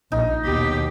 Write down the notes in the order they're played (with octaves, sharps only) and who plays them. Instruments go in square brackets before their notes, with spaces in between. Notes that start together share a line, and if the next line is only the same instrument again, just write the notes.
[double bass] A#1 [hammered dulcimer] D#4
[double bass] D#2 [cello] B2 G4